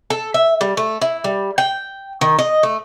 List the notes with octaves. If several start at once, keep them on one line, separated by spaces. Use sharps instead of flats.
A4
E5
G3
A3
E4
G3
G5
D#3
D#5
A3